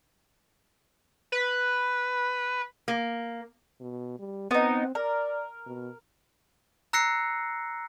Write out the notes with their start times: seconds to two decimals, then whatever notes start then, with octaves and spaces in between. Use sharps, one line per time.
1.32 B4
2.88 A#3
3.81 B2
4.19 G3
4.51 B3 C4 D#4
4.95 A#4 D5
5.66 B2
6.93 A#5 E6 F#6 A#6 C7 C#7